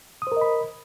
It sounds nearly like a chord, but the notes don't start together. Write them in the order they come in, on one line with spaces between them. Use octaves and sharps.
D#6 C5 A#4 D#5 B5